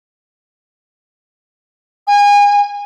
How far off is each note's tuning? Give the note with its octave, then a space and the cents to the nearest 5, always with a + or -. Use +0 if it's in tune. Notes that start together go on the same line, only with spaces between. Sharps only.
G#5 -30